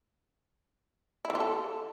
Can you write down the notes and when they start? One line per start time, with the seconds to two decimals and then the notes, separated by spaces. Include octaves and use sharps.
1.25 E4
1.30 E3
1.35 F4
1.40 A4